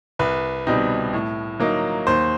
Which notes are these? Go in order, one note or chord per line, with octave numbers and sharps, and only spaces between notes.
C2 B4
B2 G3 C4 D#4
A2
F#3 A#3 D#4
D#2 C5